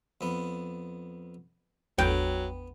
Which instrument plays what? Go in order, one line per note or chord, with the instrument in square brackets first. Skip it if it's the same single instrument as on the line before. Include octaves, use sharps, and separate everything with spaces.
[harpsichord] F2 B3
[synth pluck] G#1 E2 [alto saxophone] F#3 [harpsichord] B3 [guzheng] G5